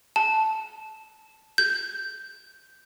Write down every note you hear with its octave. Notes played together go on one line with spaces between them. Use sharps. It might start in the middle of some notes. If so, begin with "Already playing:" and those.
A5
G6